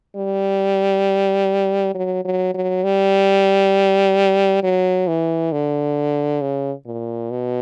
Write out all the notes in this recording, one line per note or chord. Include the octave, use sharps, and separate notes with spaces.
G3
F#3
F#3
F#3
G3
F#3
E3
D3
C#3
A#2
B2